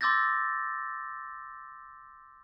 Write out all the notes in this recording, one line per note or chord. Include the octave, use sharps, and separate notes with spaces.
C6 D6 E6 G6 A6 A#6